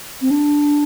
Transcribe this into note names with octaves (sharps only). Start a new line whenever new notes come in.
C4
D4